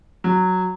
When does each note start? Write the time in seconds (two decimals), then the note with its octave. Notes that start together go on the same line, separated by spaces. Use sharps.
0.24 F#3